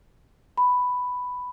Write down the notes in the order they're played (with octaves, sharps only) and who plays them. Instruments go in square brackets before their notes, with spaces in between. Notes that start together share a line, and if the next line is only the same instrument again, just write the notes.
[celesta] B5